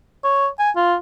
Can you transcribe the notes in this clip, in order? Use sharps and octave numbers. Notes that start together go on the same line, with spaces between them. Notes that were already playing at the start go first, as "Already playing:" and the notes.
C#5
G#5
F4